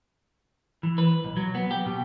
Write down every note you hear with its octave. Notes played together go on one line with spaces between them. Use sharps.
E3
B4
B1
F#3
B3
G4
B2